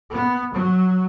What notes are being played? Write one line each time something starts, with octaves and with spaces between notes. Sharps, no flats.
B3
F#3